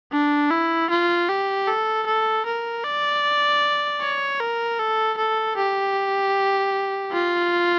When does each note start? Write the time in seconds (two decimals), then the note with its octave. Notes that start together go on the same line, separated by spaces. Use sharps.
0.13 D4
0.51 E4
0.90 F4
1.29 G4
1.68 A4
2.07 A4
2.46 A#4
2.85 D5
4.01 C#5
4.40 A#4
4.79 A4
5.18 A4
5.57 G4
7.12 F4